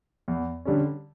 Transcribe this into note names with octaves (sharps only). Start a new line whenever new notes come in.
E2
D3 G3 C#4